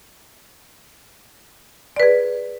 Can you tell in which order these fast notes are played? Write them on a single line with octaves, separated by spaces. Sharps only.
D5 B4 G#4